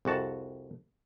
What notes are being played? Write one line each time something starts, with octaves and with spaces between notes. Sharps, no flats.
C2 F2 F#4 A5